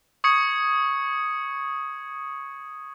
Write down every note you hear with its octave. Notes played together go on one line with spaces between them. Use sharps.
C#6 D#6 G#6 C#7